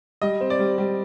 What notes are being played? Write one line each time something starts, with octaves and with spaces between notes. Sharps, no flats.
G3 D#5
C4
D5
G3
G3